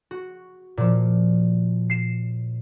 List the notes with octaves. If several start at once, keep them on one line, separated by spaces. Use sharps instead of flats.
F#4
A#2 F3
C7 C#7 E7